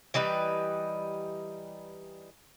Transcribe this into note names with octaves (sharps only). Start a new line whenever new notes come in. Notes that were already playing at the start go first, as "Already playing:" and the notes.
E3 G3 D#4 B4